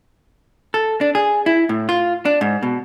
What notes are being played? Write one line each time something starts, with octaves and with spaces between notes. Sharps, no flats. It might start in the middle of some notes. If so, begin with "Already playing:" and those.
A4
D4
G#4
E4
A2
F4
D4
G#2
B2